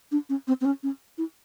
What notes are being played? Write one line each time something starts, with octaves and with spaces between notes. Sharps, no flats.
D4
C#4
C4
C4
C#4
C#4
E4